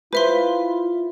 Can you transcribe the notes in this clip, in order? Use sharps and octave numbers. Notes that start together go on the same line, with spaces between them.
E4 F4 B4 C5 E5 C6